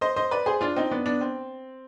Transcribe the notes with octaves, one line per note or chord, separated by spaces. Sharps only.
C5 D#5
C5 D#5
B4 D5
G#4 C5
D4 F4
C4 D#4
B3 D4
B3 D4
C4